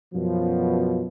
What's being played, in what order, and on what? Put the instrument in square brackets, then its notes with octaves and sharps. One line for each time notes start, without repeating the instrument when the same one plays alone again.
[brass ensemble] F#2 B2 F3